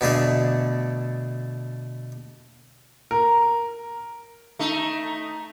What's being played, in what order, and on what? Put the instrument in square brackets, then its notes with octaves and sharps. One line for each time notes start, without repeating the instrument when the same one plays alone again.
[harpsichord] B2 D3 A3 G#4
[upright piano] A#4
[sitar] A3 D#4